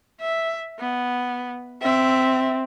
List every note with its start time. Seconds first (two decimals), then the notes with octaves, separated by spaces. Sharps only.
0.20 E5
0.79 B3
1.82 C4 E5